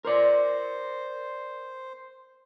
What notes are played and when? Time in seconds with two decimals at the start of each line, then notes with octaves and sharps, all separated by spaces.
0.05 A#4 C5 D5